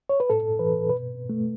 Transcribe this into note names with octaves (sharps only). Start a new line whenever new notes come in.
C#5
B4
A2 A4
E3 B4
B2 B4
A3